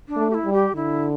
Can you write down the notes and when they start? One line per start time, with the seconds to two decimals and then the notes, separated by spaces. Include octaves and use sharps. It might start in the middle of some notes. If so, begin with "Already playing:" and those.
0.08 D4
0.16 A3
0.30 G4
0.34 E4
0.46 G3
0.53 G4
0.75 D3 E4